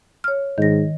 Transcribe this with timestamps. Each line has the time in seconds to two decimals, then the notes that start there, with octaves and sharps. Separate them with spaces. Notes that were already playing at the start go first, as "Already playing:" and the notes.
0.24 C#5 F6
0.58 G#2 D#3 A#6